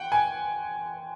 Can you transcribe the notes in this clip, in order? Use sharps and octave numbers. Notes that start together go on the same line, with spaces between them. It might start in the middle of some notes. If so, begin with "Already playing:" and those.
Already playing: F#5 G5
G#5